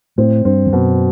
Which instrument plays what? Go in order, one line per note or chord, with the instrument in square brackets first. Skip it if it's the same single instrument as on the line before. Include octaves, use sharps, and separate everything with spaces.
[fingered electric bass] A2 [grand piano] C4
[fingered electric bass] G2 [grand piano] C4
[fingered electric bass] E2
[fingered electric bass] F#2 [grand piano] B2